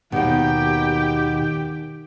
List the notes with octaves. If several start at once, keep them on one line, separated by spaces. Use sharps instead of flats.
D#2 B2 D#3 G4 G5